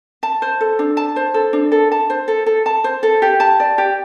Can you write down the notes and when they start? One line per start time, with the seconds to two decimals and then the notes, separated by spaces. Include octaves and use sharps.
0.23 A5
0.42 C5
0.61 A4
0.79 D4
0.97 A5
1.16 C5
1.34 A4
1.53 D4
1.72 A4
1.92 A5
2.10 C5
2.28 A4
2.46 A4
2.66 A5
2.84 C5
3.03 A4
3.22 G4
3.40 A5
3.60 D5
3.78 G4